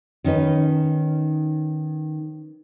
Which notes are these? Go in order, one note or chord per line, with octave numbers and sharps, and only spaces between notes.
D#3 C#4 D#4 B4